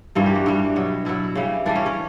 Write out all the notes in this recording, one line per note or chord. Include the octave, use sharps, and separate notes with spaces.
G2 E3 G3 A#3
G4
F#4
G2 E3 G3
B2 F#3
B2 F#3 E4
C#3 E3 G3
C#3 E3 G3 D4
C#4
C#4